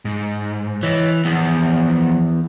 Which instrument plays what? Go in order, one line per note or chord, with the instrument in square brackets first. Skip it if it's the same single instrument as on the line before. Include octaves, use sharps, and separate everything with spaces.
[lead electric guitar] G#2
[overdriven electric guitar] E3 [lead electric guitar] C#5 D#5
[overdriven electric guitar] E2 [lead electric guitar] F3 B3